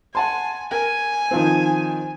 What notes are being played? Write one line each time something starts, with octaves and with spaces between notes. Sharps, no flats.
F#5 G#5 A5 C6
A#4 G#5
D#3 F3 C4